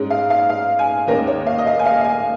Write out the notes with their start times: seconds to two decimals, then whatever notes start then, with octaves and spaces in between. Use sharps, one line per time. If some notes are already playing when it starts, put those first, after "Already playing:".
Already playing: G#2 G#3 C#4
0.10 F5
0.30 F5
0.49 F5
0.79 G#5
1.07 D#2 D#3 G#3 C#4 A#4
1.27 C#5
1.46 F5
1.58 D#5
1.67 F5
1.79 G#5
1.86 F5
2.01 F5
2.04 G#5